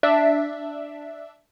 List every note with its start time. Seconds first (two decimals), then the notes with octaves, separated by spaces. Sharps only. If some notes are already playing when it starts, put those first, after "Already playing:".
0.03 D4 E5